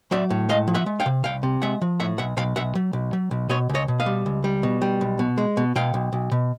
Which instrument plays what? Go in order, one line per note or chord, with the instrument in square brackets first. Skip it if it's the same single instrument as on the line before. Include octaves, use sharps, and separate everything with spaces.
[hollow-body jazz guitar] F#3 D5 E5
A2
G#3 D#5 F5
F3
E5 F#5
G#3
F5 G5
C3
C2 F5 G5
C3
G#3 E5 F#5
F3
A2 E5 F#5
B1 E5 F#5
B1 F5 G5
B1 E5 F#5
F#3
B1
F#3
B1
B2 C#5 D#5
C#2
C#5 D#5
B2
D#5 F5
G3
C#2
G3
B2
G3
B1
B2
G#3
B2
B2 F5 G5
B1
B1
B2